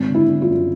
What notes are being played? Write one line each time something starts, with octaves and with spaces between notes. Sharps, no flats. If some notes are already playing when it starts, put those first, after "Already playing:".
Already playing: G#1
D3
E4
D3
F4
F#2